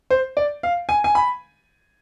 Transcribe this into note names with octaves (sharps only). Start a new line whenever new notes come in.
C5
D5
F5
G#5
G#5
B5